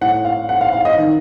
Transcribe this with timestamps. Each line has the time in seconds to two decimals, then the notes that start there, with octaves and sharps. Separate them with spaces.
0.01 A2 F#5
0.25 F5
0.49 F#5
0.61 F5
0.73 F5
0.85 D#5
0.98 D#3